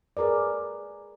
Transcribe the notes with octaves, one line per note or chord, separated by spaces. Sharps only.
G#4 A#4 B4 D5